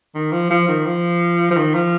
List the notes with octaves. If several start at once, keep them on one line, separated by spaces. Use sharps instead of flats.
D#3
F3
F3
D#3
F3
F3
D#3
F3